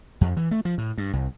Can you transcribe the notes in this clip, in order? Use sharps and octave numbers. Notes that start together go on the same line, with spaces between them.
F2
E3
A3
F3
A2
G2
C2